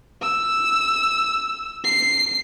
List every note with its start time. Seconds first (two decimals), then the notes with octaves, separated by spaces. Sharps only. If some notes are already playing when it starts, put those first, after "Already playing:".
0.21 E6
1.84 C7